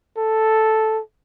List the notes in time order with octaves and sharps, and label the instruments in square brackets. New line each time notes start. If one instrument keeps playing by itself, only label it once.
[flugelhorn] A4